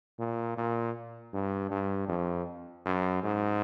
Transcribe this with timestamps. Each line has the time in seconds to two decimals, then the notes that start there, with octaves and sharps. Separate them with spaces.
0.19 A#2
0.57 A#2
1.34 G2
1.71 G2
2.09 F2
2.85 F#2
3.24 G#2